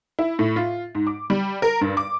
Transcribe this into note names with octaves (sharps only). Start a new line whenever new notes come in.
E4
A2
F4
G#2
D6
G3
A#4
G2
D6